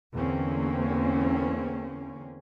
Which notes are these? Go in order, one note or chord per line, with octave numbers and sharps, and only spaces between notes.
E2 D3 A#3 C4 C#4